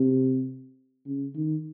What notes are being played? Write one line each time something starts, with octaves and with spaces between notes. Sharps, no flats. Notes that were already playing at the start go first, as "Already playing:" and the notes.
Already playing: C3
C#3
D#3